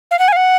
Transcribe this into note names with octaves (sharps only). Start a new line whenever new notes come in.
F5
F#5
G#5
F5
F#5